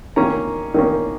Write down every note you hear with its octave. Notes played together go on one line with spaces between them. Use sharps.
D#3 A#3 C#4 A#5
D#3 A#3 C#4